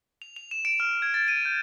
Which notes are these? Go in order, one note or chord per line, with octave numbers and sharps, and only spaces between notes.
F7
F7
E7
D7
F6
G#6
A6
D#7
G6